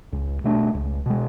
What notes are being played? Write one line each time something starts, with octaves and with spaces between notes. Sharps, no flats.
C#2
B2 A3 D4
C#2
B2 G#3